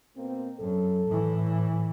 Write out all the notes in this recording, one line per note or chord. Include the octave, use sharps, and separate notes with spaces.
B2 A#3 C4
F#2 A4
A2 E3